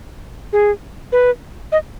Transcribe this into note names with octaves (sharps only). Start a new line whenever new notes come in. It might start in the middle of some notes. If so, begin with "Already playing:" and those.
G#4
B4
D#5